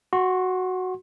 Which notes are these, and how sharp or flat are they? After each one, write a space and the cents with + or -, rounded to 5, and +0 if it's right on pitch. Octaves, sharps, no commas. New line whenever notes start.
F#4 +0 C6 +30